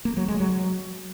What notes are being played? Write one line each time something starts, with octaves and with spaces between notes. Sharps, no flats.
A#3
F#3
G#3
F#3